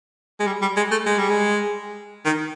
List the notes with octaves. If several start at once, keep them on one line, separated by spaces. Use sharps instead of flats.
G#3
G3
G3
G#3
A3
G#3
G3
G#3
D#3